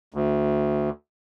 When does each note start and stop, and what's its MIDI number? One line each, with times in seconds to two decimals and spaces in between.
0.14 0.90 38